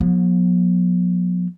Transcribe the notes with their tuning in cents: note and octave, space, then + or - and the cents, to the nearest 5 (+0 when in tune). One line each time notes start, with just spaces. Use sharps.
F3 +45 B3 -40